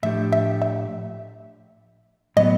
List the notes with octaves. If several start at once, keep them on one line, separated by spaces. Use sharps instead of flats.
A2 F3 A3 D4 G4 E5
E5
E5
A2 F#3 B3 D#5